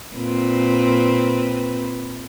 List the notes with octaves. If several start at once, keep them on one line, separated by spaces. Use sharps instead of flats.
A#2 C4 B4